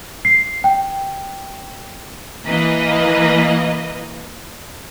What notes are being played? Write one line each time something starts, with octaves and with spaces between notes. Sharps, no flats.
C7
G5
E3 A#3 B4 D#5